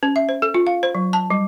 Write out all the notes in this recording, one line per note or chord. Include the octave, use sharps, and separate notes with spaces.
C#4
E5
C5
A4
F4
F5
C5
F#3
A5
G3